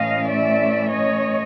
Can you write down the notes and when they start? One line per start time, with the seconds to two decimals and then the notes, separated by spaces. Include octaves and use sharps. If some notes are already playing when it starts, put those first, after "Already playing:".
Already playing: A2 E3 A3 C#4 D#5 F5
0.28 D5 E5
0.91 C#5 D#5